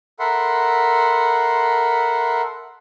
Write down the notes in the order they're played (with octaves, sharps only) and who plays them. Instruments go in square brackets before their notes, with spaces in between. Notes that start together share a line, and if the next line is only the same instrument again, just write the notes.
[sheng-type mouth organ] A4 A#4 E5 F#5 B5 C6